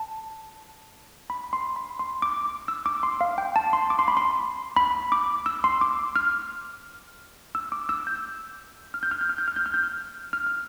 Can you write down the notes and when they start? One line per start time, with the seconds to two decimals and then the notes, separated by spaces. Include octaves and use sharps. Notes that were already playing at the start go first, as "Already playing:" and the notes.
Already playing: A5
1.30 B5
1.53 C6
1.76 B5
1.99 C6
2.22 D6
2.45 D6
2.68 E6
2.86 D6
3.03 C6
3.21 F5
3.38 G5
3.56 A5
3.73 C6
3.90 D6
3.99 C6
4.08 B5
4.17 C6
4.76 B5
5.12 D6
5.46 E6
5.64 C6
5.81 D6
6.16 F6
7.55 E6
7.72 D6
7.89 E6
8.07 G6
8.94 F6
9.03 G6
9.11 F6
9.21 G6
9.29 F6
9.38 G6
9.48 F6
9.56 G6
9.66 F6
9.74 G6
9.83 F6
10.33 F6
10.47 F6